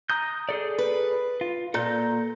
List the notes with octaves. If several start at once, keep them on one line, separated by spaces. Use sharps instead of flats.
A#5 D#6 G6
G#4 A4 D5
B4
F4
A#2 A4 A#5 G6